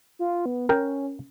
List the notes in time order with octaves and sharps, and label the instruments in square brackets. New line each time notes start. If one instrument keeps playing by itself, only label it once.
[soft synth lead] F4
B3
[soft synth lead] C#4 [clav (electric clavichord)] A#4 G5